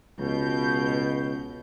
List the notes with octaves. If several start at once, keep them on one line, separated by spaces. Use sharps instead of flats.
C#2 B2 G6